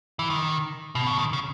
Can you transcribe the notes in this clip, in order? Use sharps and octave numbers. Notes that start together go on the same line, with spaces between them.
E3
D#3
B2
C#3
D#3
C#3